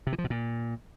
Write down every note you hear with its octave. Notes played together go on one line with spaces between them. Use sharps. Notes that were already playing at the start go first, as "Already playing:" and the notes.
C3
E3
F3
B2
A#2